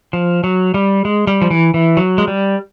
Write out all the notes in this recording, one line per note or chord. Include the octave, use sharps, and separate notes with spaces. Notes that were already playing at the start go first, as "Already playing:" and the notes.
F3
F#3
G3
G#3
G3
F3
E3
E3
F#3
G#3
G3